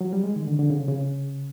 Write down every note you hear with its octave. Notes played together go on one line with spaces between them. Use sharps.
F#3
G3
G#3
D#3
D3
D3
C#3
C#3